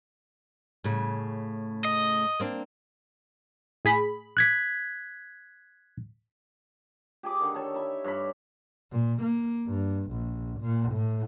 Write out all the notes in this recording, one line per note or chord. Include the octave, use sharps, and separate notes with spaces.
A2 C#3
D#5
A#3 C4 D4
A2 G#4 B5
F#6 G#6 B6
G4 G#4 D6
D3 D#3
A4 C#5
E5 B5
G2 C#5 B5
A#2
A#3
G2
A#1
A#2
A2